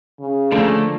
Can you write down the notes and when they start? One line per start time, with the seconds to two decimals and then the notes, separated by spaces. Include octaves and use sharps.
0.20 C#3
0.52 D3 F3 A3 A#3